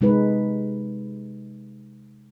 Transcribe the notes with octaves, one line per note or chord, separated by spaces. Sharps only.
C3 G#3 D#4 B4